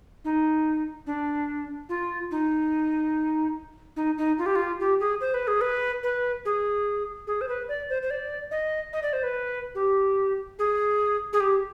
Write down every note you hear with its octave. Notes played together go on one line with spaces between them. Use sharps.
D#4
D4
F4
D#4
D#4
D#4
F4
G4
F4
G4
G#4
C5
B4
G#4
B4
B4
G#4
G#4
C5
B4
D5
C5
C5
D5
D#5
D#5
D5
C5
B4
G4
G#4
G#4
G4